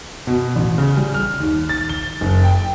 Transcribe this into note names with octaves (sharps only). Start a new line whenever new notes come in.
B2
A1
C#3
G3
F6
D#2
A6
G7
F#1
G5